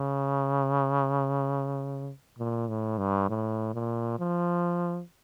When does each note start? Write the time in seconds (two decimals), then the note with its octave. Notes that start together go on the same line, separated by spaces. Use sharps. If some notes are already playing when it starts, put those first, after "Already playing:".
Already playing: C#3
2.38 A#2
2.68 A2
2.98 G2
3.29 A2
3.74 A#2
4.19 F3